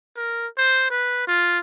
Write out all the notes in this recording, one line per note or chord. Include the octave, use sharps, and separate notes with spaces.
A#4
C5
B4
F4